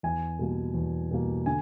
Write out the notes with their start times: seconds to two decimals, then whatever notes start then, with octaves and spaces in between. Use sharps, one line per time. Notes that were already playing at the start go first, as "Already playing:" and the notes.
0.03 E2 G#5
0.39 B2 G3 A#3
0.74 E2
1.11 B2 G3 A#3
1.46 D3 G#5